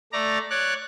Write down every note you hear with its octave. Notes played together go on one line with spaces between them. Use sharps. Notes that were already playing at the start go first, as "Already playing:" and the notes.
A3 D5 A#5
C#5 D5 F#6